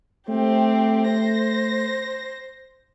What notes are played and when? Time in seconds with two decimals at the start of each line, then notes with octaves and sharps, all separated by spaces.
0.29 A3 C4 G4
1.09 C5 A#6